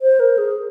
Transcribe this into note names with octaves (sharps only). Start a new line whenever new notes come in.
C5
A#4
G#4